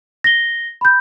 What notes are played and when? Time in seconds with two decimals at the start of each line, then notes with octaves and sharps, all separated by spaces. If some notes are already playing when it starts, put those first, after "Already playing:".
0.24 A#6 G7
0.81 B5 G6